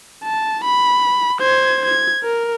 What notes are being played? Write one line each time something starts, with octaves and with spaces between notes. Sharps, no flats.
A5
B5
C5 G#6
G#6
A#4